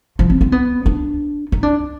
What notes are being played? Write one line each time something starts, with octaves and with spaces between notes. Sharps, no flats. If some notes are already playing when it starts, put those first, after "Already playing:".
F3
C4
C4
B3
D4
D#4
D4